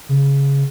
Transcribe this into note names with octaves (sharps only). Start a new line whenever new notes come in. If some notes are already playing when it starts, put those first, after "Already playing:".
C#3